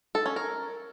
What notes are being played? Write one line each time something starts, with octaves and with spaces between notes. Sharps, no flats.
A4
C#4
A#4